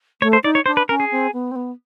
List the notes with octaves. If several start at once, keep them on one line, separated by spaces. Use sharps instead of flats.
A3 C#5
C5
D#4 D5
C#5
D4 C5
B4
C#4 A#4
G#4
C4
B3
C4
B3